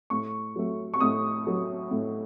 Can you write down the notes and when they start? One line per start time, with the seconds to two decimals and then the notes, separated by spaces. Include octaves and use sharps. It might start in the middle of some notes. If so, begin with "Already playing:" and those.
0.10 A2 C#6
0.56 F#3 A3
0.94 C#6
1.00 A2 D#6
1.47 F#3 A3
1.91 A2